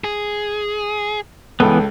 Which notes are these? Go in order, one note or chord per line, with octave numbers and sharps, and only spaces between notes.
G#4
C#2 E3 B3 A4 G5